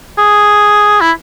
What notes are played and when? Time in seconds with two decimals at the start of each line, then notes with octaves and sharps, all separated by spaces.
0.18 G#4
1.01 E4